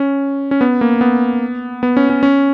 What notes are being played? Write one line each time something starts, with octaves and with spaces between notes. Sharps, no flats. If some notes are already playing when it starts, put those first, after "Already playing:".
Already playing: C#4
C#4
B3
A#3
B3
B3
C#4
C#4
C#4